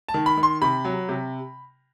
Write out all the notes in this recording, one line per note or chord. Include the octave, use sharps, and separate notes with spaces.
A5
D#3
B5
D#3
C6
C3 B5
F#3
C3